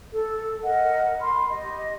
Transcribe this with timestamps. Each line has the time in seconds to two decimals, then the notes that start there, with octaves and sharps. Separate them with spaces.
0.11 A4
0.63 A#4 D#5 F#5
1.20 B5 C6
1.50 G4 D#5